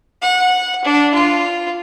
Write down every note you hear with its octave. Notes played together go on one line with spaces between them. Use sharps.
F#5
D4
F4